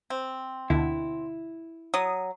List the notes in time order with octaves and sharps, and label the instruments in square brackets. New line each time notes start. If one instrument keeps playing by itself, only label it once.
[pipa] C4
[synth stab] D2 B2 D3 [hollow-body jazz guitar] E4
[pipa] F#3 [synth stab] D#6